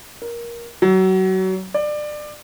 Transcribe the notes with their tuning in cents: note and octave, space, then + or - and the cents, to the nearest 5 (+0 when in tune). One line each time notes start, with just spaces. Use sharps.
A#4 +15
F#3 +25
D5 +25